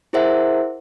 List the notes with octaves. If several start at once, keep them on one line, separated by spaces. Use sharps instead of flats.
E4 G#4 A#4 C5 E5 F#5